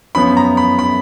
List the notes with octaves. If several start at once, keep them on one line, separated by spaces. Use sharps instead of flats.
F#2 F3 B3 B5
A#5
B5
B5